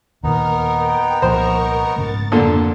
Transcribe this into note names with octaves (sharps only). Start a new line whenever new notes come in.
D#2 A#2 D#3 B3 D#4 A#4
G5
C2 A#2 F3 A#4 C5 C#6
G#2 C#3 A3 A6
F2 A#2 D3 A5